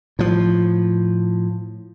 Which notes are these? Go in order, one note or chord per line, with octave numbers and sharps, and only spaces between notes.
A2 F3